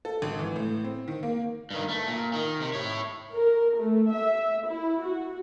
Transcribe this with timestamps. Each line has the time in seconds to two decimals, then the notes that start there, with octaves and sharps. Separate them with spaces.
0.05 A4
0.22 G#1
0.39 E3
0.56 A2
0.84 C4
1.08 D#3
1.23 A#3
1.70 G2 D#3
1.89 A3
2.07 A#2
2.33 D#3
2.61 C3
2.73 E4 C#5
3.34 A#4
3.77 A3
4.12 E5
4.67 E4
5.02 F#4